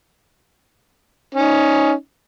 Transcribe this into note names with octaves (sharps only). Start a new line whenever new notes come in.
C#4 D#4